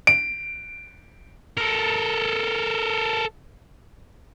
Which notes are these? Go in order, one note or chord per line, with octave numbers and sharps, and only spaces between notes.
D7
A4 A#4